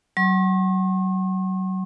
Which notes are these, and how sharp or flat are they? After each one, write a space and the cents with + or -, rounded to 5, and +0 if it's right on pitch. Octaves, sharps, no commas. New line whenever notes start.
F#3 +30 C#6 -45